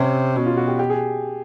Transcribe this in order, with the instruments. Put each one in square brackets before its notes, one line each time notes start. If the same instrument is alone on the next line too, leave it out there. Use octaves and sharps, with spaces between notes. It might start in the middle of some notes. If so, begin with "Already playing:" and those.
Already playing: [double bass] C3 [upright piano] C#4
[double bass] B2 [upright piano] C#4
[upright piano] F4
F#4
G4
G4
G#4